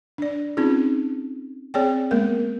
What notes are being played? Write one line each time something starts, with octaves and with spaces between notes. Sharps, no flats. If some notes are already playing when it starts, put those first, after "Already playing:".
D4 D5
C4 C#4 D#4 F4 G#4
C4 G#4 C#5 D5 G5
G#3 A#3 B3 A#4